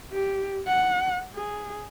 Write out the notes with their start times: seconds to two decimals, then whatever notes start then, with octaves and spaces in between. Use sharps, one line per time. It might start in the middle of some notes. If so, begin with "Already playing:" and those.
0.12 G4
0.68 F#5
1.35 G#4